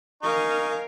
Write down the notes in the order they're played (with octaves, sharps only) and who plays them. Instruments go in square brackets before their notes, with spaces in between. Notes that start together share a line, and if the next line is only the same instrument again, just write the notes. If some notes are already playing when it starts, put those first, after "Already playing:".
[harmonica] D#4 G#5 C#6 [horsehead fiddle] A#4 F5